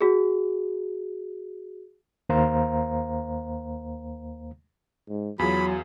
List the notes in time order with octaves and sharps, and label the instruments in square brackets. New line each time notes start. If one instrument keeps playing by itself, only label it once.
[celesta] F#4 G#4
[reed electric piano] D#2 A#3 C5 F5 A#5
[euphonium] G#2
[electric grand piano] E2 F4 G#4 [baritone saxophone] F#3 [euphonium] F#4 [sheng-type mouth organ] B5